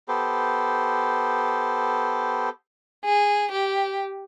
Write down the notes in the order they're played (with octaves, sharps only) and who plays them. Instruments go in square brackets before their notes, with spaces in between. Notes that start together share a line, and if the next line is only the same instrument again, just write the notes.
[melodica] B3 G4 A4 C5
[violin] G#4
G4